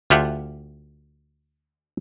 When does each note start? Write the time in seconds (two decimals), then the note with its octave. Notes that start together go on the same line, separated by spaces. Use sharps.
0.10 D2 F4 G4 E5 F#5